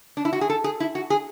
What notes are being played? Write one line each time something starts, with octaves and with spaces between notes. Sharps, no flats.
D4
E4
F#4
G#4
A4
G#4
E4
F#4
G#4